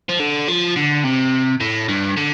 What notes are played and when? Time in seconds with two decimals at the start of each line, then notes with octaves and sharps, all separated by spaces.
0.09 F3
0.20 D3
0.48 F3
0.76 D3
1.04 C3
1.60 A2
1.89 G2
2.17 D3